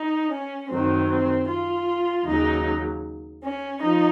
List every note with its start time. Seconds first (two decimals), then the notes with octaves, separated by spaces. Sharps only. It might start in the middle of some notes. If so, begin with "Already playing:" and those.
Already playing: D#4
0.31 C#4
0.69 F#2 D#3 F#3 C4
1.08 C4
1.48 F4
2.25 D#2 C#3 F#3 D#4
3.42 C#4
3.81 F3 D#4